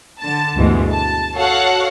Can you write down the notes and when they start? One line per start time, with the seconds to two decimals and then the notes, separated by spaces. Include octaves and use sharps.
0.20 D3 A5
0.56 D2 G2 B2 E3 G#3
0.91 A5
1.37 F#4 A4 C#5 F5 F#5